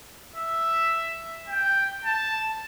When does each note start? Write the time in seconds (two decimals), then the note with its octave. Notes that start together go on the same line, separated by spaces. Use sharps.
0.36 E5
1.49 G5
2.05 A5